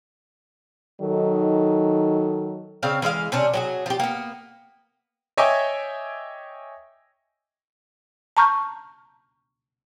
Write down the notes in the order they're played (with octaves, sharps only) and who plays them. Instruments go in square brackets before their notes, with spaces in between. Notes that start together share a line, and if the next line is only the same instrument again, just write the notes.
[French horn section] D#3 F#3 D#4 A4
[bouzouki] C#3 C4 F5
E3 G#3 E5 F5
C3 C#4 D4
F#3 G4 G#4
F3 G4
A#3 B3
[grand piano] C#5 D#5 E5 G5 G#5 D6
[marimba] A5 A#5 C#6 F6 G6